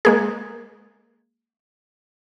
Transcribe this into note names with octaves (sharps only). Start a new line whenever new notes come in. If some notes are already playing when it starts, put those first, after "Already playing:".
G#3 A#3 G#4